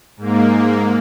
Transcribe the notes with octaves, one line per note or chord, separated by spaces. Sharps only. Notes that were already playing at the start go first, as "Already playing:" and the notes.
G#2 A#3